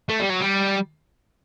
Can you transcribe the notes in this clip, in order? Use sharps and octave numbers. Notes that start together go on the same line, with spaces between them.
A3
G3
F#3
G3